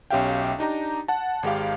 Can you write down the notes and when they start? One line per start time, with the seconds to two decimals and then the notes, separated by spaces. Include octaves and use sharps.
0.10 B1 C#4 G4 E5 F5 G5
0.59 D4 D#4 G4 A#5
1.08 F#5 A5
1.43 G#1 G#3 G4 F5